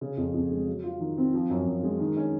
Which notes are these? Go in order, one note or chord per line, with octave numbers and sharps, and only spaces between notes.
C#3
F2
F2
G#3
F#3
F4
D#3
C4
F3
F#2
F#2
G#3
D#3
C#4